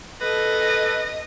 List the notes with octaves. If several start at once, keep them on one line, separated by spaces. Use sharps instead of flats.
A4 B4 D#5